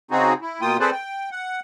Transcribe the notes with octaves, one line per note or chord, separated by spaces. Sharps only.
C#3 C4 D#4 F#4 G#4
E4
B2 A#3 F4 G5 D#6
C4 G#4 A4 B4 C5 D5
G5
F#5